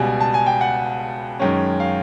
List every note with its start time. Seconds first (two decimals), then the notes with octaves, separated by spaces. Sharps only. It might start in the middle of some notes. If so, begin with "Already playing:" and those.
Already playing: C#2 B2 G3 G#5
0.21 A5
0.34 G#5
0.46 G5
0.61 F#5
1.39 F#2 D#3 G#3 C#4
1.80 F5